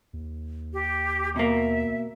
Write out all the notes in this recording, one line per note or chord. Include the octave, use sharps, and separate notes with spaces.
D#2
G4
B2 A#3 E5